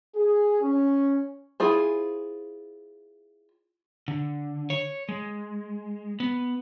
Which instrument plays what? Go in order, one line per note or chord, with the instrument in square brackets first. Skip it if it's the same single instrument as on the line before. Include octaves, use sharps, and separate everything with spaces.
[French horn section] G#4
C#4
[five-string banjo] E4 F4 G#4 C5
[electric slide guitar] D3
C#5
G#3
B3